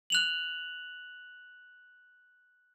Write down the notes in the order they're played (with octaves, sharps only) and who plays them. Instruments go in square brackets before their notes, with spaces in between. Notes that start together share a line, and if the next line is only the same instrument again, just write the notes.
[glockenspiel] F#6 F7 F#7